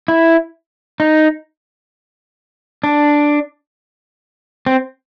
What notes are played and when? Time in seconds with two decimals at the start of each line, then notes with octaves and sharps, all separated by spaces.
0.08 E4
1.00 D#4
2.84 D4
4.66 C4